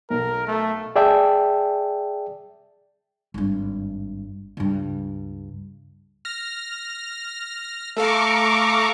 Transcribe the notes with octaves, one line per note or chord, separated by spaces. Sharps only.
B1 A#4
A3
G#4 D5 E5 G5 A5
G#1 G2
C#2 G2
F6 A#6
A3 A4 F5 A#5 C#6 D6